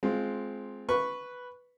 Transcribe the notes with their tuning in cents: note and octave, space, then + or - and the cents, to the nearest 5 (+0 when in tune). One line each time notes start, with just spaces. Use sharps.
G#3 +20 C4 +0 F4 +0
B4 +0 C#6 +0